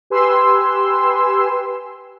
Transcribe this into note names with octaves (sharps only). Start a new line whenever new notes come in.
G4 B4 G#5 C6 E6